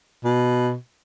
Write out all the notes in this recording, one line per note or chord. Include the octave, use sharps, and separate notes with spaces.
B2